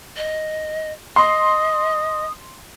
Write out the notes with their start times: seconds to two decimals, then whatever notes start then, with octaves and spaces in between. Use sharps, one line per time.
0.17 D#5
1.16 D#5 C6 D#6